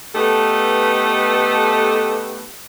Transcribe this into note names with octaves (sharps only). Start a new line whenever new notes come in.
A3 B3 D#4 G4 A4 B4